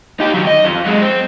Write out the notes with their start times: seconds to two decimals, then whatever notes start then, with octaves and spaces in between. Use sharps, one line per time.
0.20 D#4 G4
0.34 D#3 F#3
0.47 D#5
0.65 F2
0.86 F#3 G#3
1.02 C4